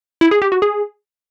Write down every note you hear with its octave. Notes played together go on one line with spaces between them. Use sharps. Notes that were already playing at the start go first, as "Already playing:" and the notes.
E4
G#4
G4
F#4
G#4